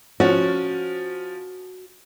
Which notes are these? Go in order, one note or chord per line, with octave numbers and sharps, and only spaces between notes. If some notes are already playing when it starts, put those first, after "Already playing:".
F3 C#4 F#4